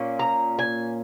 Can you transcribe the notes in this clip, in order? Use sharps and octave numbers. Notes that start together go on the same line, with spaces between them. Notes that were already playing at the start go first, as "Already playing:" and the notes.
Already playing: A#2 A#3 C#4
A#5
G#5